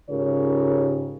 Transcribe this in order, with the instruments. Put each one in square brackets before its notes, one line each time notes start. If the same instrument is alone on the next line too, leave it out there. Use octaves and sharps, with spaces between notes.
[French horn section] G#2 C#3 F4 G4 A#4 C#5